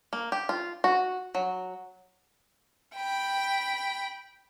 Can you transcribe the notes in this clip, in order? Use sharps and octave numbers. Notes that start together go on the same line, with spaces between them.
A#3
G4
F4
F#4
F#3
G5 B5